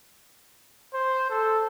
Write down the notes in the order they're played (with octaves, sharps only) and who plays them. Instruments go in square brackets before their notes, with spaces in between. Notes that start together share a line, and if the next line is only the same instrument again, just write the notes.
[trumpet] C5
A4